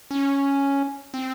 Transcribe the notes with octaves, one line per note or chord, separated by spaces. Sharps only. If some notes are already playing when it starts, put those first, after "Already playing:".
C#4
C4